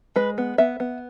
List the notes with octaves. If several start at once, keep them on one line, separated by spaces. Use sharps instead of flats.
G#3 B4
B3
B3 E5
B3